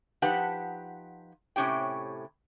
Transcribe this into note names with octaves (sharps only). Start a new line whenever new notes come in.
F3 D#4 G4 B4 F#5 A5
A2 C3 C#4 G4 G5